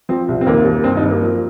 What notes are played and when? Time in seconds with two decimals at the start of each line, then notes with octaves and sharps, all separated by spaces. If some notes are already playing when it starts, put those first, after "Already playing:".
0.09 F3 C4
0.28 C2
0.41 C4
0.46 D#2 A#3
0.65 D#2
0.84 G2 C4
0.97 D#4
1.02 G2
1.09 A#3
1.22 F3